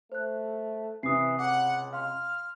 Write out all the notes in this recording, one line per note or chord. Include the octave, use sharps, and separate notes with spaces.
A3 C5 F#6
C3 E3 D#6 C7
C#2 F#5 D6
F5 C6 F6